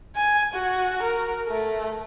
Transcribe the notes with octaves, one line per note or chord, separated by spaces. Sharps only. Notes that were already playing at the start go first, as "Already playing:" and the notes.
G#5
F#4
A#4
A3